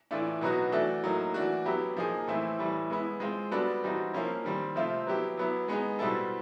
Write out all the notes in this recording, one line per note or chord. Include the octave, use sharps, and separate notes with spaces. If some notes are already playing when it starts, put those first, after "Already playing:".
A2 E3 A3 D4 F4
B2 F#3 B3 D#4 F#4
E3 A3 D4 F#4 A4
A2 F#3 A#3 D#4
E3 A3 D4 F#4
F#3 B3 E4 G4
F3 A#3 D#4 G#4
A2 E3 A3 C4 E4
A2 E3 G3
G#3 B3 E4
G#3 C4 F4
G3 B3 D4 F#4 A4
E3 G3 C4 D#4 F#4
F3 A#3 C#4 E4
D#3 G3 C4
C3 F3 A3 C4 F4
F#3 B3 E4 G4
F#3 B3 E4
G#3 B3 D#4 G#4
B2 G3 C4 E4 A4